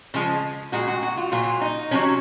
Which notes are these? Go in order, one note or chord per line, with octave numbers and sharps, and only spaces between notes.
C#3 F3 G#3
A#2 G#3 F#4
F#4
F#4
F4
A#2 F#3 F4
D#4
C3 F#3 C#4